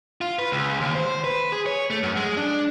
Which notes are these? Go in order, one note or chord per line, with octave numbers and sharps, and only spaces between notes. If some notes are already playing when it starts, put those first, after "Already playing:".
F4
B4
C#2
D#2
C5
B4
G#4
C#5
A3
F#2
G#3
D4